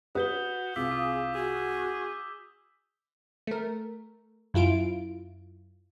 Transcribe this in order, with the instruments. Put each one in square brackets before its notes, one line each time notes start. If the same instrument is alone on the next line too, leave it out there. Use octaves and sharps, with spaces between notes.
[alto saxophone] F#4 [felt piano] B4 [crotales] D#6 G6 G7
[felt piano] C2 [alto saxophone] F4 [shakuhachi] G#4 [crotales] D6 E6 B6
[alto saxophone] F4
[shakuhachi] F#4 [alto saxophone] G#4
[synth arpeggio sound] A3 A#4
F#2 E4 F4 D7